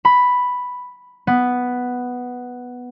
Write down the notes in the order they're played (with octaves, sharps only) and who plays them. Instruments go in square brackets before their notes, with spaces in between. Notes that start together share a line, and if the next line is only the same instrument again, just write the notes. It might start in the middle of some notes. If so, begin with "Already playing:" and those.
[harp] B5
B3